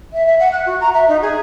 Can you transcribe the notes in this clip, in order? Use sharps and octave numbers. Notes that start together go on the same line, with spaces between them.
E5
E5
F#5
F#6
F#4
A#5
E5
D#4
G#4